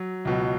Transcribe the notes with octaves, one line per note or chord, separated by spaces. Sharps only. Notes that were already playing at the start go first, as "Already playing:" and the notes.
Already playing: F#3
C#2 B2 F#3